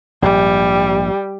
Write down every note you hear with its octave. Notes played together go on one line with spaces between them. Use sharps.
A#1 G#2 G3